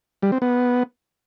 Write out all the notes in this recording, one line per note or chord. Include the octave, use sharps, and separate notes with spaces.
G3
C4
B3